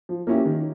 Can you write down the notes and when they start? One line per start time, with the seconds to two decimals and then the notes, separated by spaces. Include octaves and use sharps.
0.09 F3
0.27 A#3 C#4 E4 G4
0.46 D#3